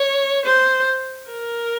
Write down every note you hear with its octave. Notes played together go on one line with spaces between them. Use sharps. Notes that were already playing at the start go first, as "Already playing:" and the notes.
Already playing: C#5
C5
A#4